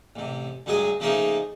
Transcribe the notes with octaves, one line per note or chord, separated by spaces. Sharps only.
A1 C3
D2 G2 F#3 G#3 G#4 G#5
C#3 F3 A3 A#3 D#4 G#4